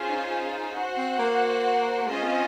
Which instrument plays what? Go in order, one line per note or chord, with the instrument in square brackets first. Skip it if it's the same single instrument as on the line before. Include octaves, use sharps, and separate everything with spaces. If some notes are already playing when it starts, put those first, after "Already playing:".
Already playing: [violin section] C#4 F4 G#4 C5
[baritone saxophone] D#4
[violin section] F#4 C5 F#5
[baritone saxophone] C4
A#3
A#3
[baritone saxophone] G#3 [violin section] C#4 F4 C5 D#5
[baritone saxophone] C4